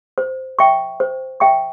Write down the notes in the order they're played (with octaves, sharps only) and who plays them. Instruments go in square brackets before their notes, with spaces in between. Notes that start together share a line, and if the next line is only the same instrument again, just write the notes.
[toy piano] C5
E5 G5 C#6
C5
E5 G5 C#6